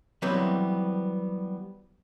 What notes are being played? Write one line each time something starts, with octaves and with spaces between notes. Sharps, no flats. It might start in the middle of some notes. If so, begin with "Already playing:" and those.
E3 F#3 G3 B3 C4